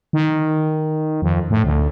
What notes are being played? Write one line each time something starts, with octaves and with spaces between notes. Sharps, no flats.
D#3
F2
A2
D2